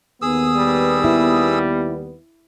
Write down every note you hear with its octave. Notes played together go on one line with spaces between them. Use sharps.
D#2 B3 G#4 D#6 E6
G3
E4